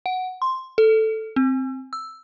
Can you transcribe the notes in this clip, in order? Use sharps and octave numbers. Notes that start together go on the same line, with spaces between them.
F#5
C6
A4
C4
E6